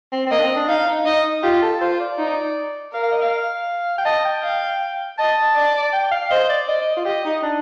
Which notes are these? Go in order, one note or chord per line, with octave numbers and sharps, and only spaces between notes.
C4
C4
A#3 D#5
D4
C4
D4
D#4 F5
D#4
D#4 D#5
F4 G4
A4
F4 C5
D5
D#4
A#4 F5
F5
D#5
F5
G5
D#5 A5
G5
F5
D#5 A5
D5
G5
F5
C5 D#5
D5
D5 D#5
D#5
F4
G4 D#5
D#4
D4